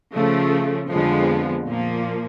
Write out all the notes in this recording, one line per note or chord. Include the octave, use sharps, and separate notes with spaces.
C#3 F3 A3
F2 D3 F3 G#3 B3
A#2 F3 A#3